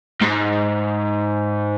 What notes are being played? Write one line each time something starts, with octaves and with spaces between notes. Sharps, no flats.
G#2